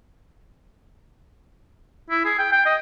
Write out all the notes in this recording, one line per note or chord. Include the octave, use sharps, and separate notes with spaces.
E4
G#4
G5
G5
D#5